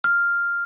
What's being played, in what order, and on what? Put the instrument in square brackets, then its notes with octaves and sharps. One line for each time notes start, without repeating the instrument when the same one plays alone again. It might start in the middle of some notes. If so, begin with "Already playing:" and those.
[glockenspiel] F6